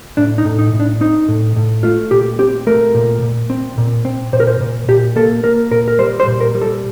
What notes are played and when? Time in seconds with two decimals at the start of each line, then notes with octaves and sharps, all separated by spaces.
0.17 A2 D4
0.38 D#4
0.45 A2
0.59 D#4
0.73 A2
0.80 D4
1.01 C4 D#4
1.28 A2
1.56 A2
1.83 A3 F4
2.11 A#2 G4
2.39 C4 G4
2.67 A3 A#4
2.94 A#2
3.22 A#2
3.50 C4
3.78 A#2
4.05 C4
4.33 A#2 C5
4.40 A#4
4.47 C5
4.60 A#2
4.88 A#2 G4
5.16 A#3 A4
5.44 A#3 A#4
5.71 A#2 A#4
5.88 A#4
5.99 G3 C5
6.20 C5
6.27 A#2
6.41 A#4
6.55 G3
6.61 A4